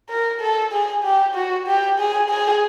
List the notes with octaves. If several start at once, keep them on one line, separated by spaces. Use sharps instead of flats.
A#4
A4
G#4
G4
F#4
G4
G#4
G#4